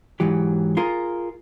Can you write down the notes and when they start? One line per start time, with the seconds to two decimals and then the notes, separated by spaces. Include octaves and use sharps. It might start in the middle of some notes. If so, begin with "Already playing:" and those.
0.20 G#2 E3 F#3 G4
0.77 F4 G#4 A#4